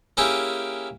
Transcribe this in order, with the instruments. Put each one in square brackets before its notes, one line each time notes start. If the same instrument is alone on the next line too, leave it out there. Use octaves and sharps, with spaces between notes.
[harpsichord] A#3 C#4 E4 G4 G#4 G5